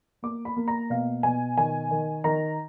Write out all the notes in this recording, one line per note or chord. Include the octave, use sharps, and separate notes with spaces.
A#3 D6
B5
A#3
A#5
B2 F5
B2 G#5
D#3 G#5
D#3
D#3 A#5